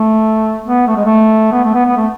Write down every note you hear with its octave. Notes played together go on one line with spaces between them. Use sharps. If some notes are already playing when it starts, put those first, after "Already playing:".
Already playing: A3
B3
A3
G#3
A3
B3
A3
B3
B3
A3